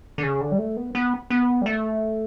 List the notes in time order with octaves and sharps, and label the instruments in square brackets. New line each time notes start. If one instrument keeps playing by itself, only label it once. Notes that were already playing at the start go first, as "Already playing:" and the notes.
[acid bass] D3
C#3
D3
G3
A3
B3
B3
B3
G3
A3